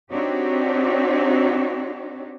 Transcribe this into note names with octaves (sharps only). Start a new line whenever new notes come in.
C4 D4 D#4 F#4 G4 C#5